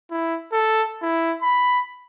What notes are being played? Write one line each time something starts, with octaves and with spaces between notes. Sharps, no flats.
E4
A4
E4
B5